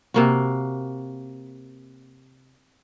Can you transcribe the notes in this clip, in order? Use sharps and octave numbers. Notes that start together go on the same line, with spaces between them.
C3 A#3 F#4